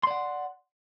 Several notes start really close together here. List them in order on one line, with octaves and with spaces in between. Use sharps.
C6 D5 F#5